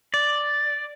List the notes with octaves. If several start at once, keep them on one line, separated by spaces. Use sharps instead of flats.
D5